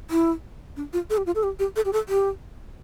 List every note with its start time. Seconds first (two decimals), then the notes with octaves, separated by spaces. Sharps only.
0.10 E4
0.76 D4
0.93 F4
1.10 A4
1.17 G4
1.26 F4
1.35 A4
1.43 G4
1.59 G4
1.76 A4
1.85 G4
1.93 A4
2.09 G4